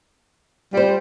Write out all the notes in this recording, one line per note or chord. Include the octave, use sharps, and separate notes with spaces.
G3 F4 C5